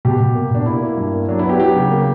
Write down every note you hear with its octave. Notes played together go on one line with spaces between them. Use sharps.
B2 G4
B2
A#3
B2 D4
A#3 E4
A#3
G2
A#3
F#3 D4
E4
B3 G4
F#3 G4
C#3
A#3